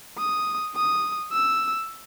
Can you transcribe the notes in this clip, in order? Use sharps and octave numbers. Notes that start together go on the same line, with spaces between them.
D#6
D#6
E6